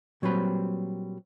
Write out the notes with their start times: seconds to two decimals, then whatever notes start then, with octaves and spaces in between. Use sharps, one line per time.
0.22 A#2 F#3 G3 C4 B4